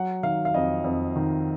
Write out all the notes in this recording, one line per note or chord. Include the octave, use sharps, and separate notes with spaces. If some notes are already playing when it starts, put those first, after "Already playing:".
Already playing: F#3 F#5
D#3 F5
F5
F2 D#5
F2
D#3